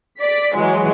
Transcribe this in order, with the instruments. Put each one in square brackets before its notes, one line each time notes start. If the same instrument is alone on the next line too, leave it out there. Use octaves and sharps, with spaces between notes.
[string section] D5 B6
E3 F#3 G#3